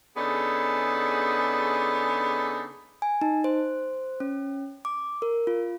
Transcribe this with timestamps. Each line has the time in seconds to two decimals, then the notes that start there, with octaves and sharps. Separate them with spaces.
0.16 C#3 B3 D4 D#4 G#4 A4
3.02 G#5
3.21 D#4
3.44 C5
4.20 C#4
4.85 D6
5.22 A#4
5.47 F4